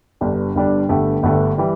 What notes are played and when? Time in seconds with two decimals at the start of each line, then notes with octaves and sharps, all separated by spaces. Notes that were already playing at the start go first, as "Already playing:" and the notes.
0.21 G1 G2 G3 D4
0.55 G1 G2 G3 D4
0.89 G1 G2 D3 A3 G4
1.23 G1 G2 D3 A3 G4
1.58 E3 G3